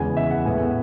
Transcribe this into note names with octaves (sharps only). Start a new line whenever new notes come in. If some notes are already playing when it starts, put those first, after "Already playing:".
Already playing: E2 C#3 G#3 B3 G#5
E5
F#5
A2 G#3 B3 G#5